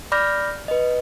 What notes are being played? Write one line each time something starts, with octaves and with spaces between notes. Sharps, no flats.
D5 B5 D6 F6 G6 A#6
B4 D#5